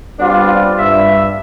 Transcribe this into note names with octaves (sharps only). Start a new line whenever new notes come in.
G3 B3 C4 D4 F4 D5
G2 E5